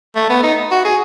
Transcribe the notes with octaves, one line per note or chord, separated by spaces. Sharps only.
A3
B3
D#4
F#4
G#4